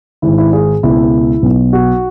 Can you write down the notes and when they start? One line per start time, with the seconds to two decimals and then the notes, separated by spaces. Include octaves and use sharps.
0.22 G#1 G#2 D#3 E4
0.38 E4
0.53 G#4
0.83 C#2 B2 E4
1.42 B1 B2
1.73 F#4